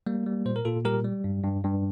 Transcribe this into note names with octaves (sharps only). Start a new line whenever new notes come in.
G3 A#3
G3
A#2 C5
A#4
A#2 F4 A4
G3 G4 A#4
G3
G2
G2
G2